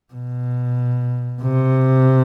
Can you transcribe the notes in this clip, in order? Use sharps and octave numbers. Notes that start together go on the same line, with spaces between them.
B2
C3